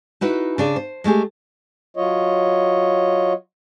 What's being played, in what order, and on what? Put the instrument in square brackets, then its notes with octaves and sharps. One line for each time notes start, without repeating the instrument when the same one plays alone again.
[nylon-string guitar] D#4 E4 F#4 B4
C#3 D4 G#4
C5
G#3 A3 G4 G#4
[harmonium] F#3 F4 C#5 D#5